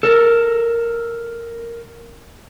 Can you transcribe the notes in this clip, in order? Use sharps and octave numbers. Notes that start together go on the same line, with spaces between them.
A4 A#4